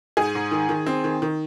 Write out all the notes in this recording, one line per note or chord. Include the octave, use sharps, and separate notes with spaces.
G#2 G#4
G#2
D#3
D#3
C4
D#3
D#3